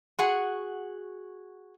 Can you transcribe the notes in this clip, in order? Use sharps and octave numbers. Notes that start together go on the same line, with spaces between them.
F#4 G#4 F#5